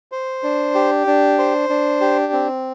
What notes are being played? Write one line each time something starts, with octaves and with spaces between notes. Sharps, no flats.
C5
D4
G4
D4
C5
D4
G4
C4